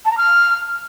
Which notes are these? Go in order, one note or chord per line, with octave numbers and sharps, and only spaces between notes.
A5
A#5
F6